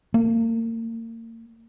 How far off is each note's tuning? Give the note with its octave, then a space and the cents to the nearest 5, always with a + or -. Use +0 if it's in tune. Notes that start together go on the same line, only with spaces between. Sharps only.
A#3 -35